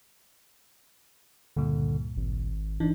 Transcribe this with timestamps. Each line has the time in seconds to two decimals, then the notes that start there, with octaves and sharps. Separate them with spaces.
1.56 C#2 G2 A#2 D3
2.16 G#1
2.80 G1 E3 D4 D#4